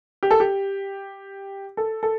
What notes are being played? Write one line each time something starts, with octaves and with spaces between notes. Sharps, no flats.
G4
A4
G4
A4
A4